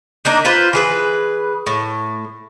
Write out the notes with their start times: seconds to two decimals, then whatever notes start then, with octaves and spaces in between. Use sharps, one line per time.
0.25 A#3 D4 D#4
0.45 F4 B4 C5
0.73 E3 G#4 B4
1.66 A2